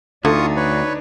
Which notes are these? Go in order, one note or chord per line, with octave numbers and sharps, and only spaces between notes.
D2 D3 D4 D#4 F4 C#6 D#6
B4 C#5